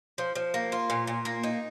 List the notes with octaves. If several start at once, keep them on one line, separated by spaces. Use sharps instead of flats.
F3
F3
A#3
F4
A#2
A#2
A#3
D#4